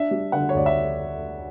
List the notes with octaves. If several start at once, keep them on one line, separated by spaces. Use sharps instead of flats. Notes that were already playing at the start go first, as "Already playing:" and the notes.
Already playing: D4 E5
G3
D3 F#5
C#5
D2 D5
E5